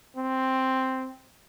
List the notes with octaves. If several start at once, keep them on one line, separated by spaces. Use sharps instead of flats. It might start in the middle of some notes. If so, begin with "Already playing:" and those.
C4